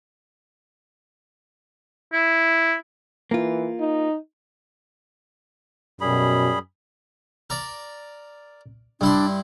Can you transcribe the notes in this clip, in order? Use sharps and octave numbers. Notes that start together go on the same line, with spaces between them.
E4
E3 A#3 F4
D#4
F#2 B2 G3 G#4 B5
A#4 D5
G2 D4 E4 C6